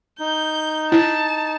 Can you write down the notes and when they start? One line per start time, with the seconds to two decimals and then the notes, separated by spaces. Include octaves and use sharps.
0.19 D#4 G6
0.92 E4 A5